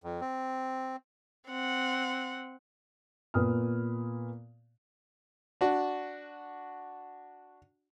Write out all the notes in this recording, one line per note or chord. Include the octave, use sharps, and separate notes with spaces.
F2
C4
C4 F#5
A#2 B3 D#6 F6
D4 F#4